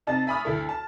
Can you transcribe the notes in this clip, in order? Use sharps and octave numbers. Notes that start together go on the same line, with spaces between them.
C3 D#4 A5 A6
E5 G#5 B5 C#6 D#6 F6
D2 E4 A4
A5